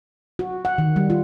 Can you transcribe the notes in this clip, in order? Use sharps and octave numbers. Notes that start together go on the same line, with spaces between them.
F#4
F#5
D#3
G3
F4